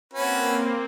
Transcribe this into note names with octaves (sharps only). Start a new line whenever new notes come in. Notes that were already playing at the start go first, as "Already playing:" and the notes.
A#3 C4 C#4 F#4 B4